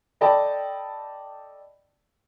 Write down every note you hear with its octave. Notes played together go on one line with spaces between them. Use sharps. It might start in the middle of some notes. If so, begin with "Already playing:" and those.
A4 D5 D#5 G5 A5 B5